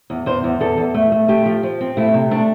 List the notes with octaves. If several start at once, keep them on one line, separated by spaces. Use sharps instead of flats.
E2
E2 C5
E2
E2 A4
E2
A3
A3
A3 G4
F3
F3
C4
A3 E4
C3
A3 D4